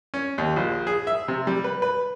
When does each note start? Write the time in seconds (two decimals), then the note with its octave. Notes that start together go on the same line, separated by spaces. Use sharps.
0.14 C#4
0.38 D#2
0.56 A#1
0.87 G#4
1.07 E5
1.28 C3
1.47 G3
1.64 B4
1.82 B4